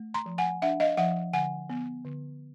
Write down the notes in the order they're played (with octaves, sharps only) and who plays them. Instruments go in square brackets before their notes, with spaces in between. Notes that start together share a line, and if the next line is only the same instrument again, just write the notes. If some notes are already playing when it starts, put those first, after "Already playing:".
Already playing: [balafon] A3
A#5 C6
F3
F#5 G#5
D4 E5 F#5
D#5 F5
F3 E5 F#5
D3 F#5 G#5
B3
D3